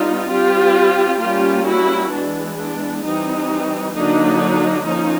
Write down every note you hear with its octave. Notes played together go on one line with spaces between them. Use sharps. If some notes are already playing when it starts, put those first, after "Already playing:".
Already playing: G3 B3 D4 D#4 F4
G3 C4 F4 G4
G3 A#3 C#4 F4 G4
E4 F#4
E3 G#3 B3 D4
D4
E3 G3 C4 D#4
D3 F#3 A#3 D4 D#4
F3 A#3 C#4 D#4